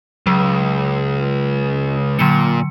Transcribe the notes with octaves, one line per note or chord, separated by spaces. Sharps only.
C#2 F#3
A#2 D3 F#3 C#7